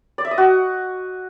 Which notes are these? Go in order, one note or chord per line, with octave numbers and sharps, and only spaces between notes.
D5
E5
D#5
F#4